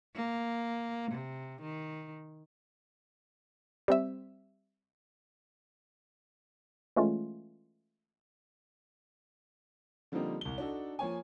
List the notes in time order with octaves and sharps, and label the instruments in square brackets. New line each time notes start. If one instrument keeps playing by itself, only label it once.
[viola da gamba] A#3
C3
D#3
[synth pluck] G3 C4 E5
E3 G#3 A3 C#4 F4
[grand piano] D3 F3 G3 A#3 C4 D#4
C2 G7
D4 D#4 F#4 A4
F3 A#3 C#5 G#5